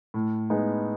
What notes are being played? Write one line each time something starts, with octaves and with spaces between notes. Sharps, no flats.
A2
G#3 B3 D#4